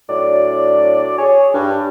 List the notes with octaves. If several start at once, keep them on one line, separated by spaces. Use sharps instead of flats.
A2 F#3 D4 D5
G#4 C#5
G2